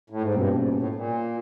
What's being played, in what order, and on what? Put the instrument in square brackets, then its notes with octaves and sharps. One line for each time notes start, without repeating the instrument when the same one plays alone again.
[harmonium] A2
G#2
[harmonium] G2 [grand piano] B2 G3 A#3 C#4 F4
[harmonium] G#2
A#2
A2
A#2